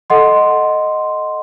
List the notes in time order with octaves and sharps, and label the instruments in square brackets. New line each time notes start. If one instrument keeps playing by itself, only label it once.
[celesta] A4 D#5 F#5 C6